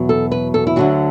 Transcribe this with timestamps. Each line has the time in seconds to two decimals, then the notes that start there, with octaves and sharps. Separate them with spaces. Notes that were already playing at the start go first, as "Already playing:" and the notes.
Already playing: E2 B2 F#3
0.09 A4
0.32 B4
0.54 A4
0.67 E4
0.76 D2 D3 F#3 F#4